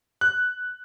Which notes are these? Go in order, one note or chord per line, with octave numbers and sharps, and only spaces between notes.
F#6